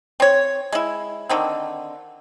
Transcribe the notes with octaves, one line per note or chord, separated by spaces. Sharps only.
C4 C#5
G#3 E4
D3 D#3 C4